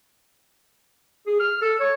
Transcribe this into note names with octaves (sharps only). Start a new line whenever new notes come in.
G#4
F6
A4
C#5